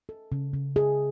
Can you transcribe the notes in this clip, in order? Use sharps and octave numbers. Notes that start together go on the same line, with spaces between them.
A4
C#3
C#3
G#4